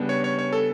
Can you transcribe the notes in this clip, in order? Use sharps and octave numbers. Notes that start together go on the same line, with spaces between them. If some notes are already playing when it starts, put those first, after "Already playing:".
Already playing: C#3 G3 B3 D4
C#5
C#5
C#5
A4